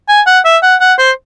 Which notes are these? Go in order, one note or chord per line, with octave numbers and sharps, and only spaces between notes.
G#5
F#5
E5
F#5
F#5
C5